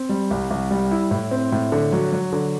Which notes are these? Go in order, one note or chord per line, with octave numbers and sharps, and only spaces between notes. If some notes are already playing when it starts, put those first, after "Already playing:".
Already playing: C4
G3
C2
C2
G3
E4
A2
C4
A2
D3
F#3
F#3
D3